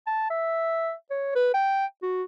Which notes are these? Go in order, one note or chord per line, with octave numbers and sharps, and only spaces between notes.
A5
E5
C#5
B4
G5
F#4